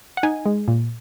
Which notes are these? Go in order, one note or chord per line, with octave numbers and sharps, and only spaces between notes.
F#5
D#4 G#5
G#3
A#2